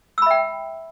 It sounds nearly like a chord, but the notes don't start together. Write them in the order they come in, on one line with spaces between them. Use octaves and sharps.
E6 B5 E5 G5